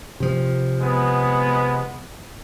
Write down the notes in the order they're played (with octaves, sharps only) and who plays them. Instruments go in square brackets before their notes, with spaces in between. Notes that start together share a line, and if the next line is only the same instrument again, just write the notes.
[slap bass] C3 F3
[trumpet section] G#3 B3